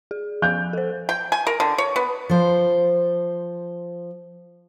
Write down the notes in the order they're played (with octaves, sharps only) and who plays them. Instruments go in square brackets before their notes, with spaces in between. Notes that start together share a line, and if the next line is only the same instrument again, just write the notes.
[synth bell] G#4
[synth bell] F3 F5 G#5 [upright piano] G6
[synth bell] A4 C5
[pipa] G5
G#5
A#4
D3
C#5
B3
[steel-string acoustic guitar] F3 C5